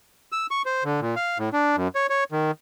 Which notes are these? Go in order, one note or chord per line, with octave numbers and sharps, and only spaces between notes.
E6
C#6
C5
D3
A#2
F5
A2
D4
F#2
C#5
C#5
D#3